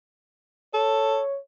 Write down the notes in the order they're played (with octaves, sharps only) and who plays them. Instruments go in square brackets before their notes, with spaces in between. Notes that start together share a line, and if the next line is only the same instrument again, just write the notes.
[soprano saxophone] A4 [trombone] C#5